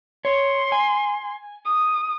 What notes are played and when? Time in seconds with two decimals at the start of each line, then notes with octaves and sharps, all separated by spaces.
0.25 C#5 C6
0.72 G#5
1.65 D#6